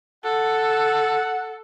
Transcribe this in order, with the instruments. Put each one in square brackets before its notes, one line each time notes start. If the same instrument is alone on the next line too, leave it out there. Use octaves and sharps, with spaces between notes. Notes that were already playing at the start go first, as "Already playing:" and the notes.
[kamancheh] A4 [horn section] F#5